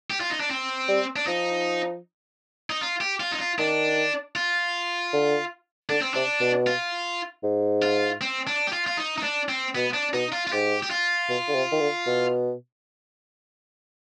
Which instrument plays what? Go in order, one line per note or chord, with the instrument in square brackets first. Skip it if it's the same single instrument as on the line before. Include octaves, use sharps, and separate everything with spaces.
[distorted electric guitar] G4
F4
D#4
D4
C4
[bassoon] G3
[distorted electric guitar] D4
[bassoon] F3 [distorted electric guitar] D#4
[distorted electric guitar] D#4
F4
G4
F4
D#4
F4
[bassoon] D#3 [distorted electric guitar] D4
[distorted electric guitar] F4
[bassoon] D3
[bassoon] D3 [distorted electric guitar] D4
[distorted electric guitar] C4
[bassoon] C3 [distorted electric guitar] D4
[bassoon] B2
[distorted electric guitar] F4
[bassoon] G#2
[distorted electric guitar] F4
C4
D4
G4
F4
F4
D#4
D#4
D4
C4
[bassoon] B2 [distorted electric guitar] B3
[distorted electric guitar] D4
[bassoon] B2 [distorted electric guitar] D#4
[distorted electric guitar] F4
F4
[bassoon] G#2 [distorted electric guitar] G4
[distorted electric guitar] G4
F4
[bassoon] B2
D3
C3
D#3
D3
B2